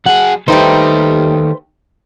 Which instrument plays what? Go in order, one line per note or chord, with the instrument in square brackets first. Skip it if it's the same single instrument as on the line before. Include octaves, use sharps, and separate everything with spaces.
[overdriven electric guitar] F#3 G#4 [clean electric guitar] F#5
[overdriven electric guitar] D#3 G4 [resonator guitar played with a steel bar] G3 A3 D#4 [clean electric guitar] B4 C5